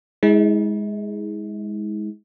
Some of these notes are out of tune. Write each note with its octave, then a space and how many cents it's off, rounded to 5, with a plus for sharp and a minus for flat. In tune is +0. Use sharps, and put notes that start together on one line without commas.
G#3 +0 E4 -45